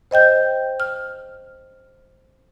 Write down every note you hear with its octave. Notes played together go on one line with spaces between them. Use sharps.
C5 D#5 G5 G6
F6